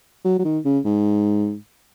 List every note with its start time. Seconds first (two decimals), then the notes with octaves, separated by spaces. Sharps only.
0.24 F#3
0.39 F#3
0.44 D#3
0.65 C#3
0.85 G#2